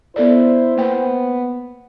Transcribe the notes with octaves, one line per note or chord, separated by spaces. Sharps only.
B3 E4 A4 C5 D5
A#3 B3 G5